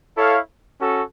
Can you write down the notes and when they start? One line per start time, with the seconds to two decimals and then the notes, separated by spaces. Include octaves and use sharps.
0.17 E4 A4 C#5 F5
0.80 C#4 F#4 A4